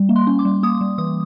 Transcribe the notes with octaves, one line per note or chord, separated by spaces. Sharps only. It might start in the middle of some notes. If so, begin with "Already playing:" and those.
Already playing: G3
A#3
C6
C#4
D6
G3
A#3 D#6
G3
E3 D#6